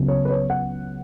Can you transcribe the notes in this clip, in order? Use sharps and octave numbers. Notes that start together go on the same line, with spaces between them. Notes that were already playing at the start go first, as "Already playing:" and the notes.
Already playing: C#2 C#3 F#3 B3
C#5
B4
C#5
F#5